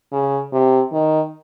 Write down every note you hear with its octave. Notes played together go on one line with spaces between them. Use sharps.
C#3
C3
D#3